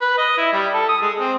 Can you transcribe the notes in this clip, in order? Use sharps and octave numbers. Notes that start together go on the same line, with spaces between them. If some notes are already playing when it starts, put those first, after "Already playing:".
B4
D#5
E4
G3
A4
D#6
G#3
C4